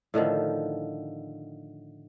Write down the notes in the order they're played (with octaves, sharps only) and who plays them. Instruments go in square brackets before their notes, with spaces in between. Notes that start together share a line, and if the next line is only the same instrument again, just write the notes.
[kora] A2 D3 D#3 F3